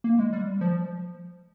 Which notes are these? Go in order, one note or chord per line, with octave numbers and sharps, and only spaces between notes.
A#3
G#3
G3
F3